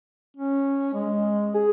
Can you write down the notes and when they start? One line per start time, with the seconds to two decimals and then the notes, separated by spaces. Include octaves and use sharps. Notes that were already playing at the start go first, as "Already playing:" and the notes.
0.37 C#4
0.94 G#3
1.54 G#4